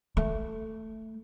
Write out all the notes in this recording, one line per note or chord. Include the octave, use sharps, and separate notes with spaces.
A3